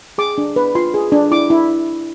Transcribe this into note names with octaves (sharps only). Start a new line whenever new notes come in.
G#4 D6
D4
B4
F4 C6
G#4
D4
E4 D6
E4